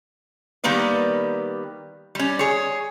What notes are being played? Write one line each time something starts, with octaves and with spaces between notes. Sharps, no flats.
D#3 G3 A#3 B3 B4 D5
G3 C#4
G#4 C#5